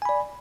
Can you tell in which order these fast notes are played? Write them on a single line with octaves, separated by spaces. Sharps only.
G#5 B5 D5